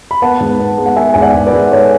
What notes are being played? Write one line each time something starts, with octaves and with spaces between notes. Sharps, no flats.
B5
B3 F#5 A5
G#2
B3
G#3
F#5
B3 E5 G#5
G#2 G#5
D5 F#5
G#2
B4 D5
G#2
G#3 A4 C#5